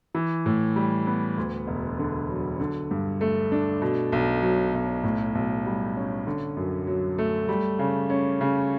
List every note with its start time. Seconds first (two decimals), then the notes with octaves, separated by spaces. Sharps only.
0.15 E3
0.46 A2
0.76 G3
1.07 B3
1.38 D2
1.67 E1
1.99 D3
2.29 F#3
2.60 D3
2.91 G2
3.21 A3
3.52 D4
3.82 B2
4.12 B1
4.42 F#3
4.74 B1
5.03 A2
5.35 B1
5.66 G3
5.96 C#4
6.27 D3
6.57 F#2
6.87 F#3
7.18 A3
7.49 G3
7.79 C#3
8.10 C#4
8.41 C#3